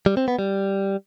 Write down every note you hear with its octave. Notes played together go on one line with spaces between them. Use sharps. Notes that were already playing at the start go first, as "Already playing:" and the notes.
G3
C4
B3
G3